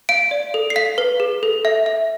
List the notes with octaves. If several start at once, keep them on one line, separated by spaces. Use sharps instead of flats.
F5 D7
D5
A4
C7
F5 B6
B4
G#4
A4
E5
E5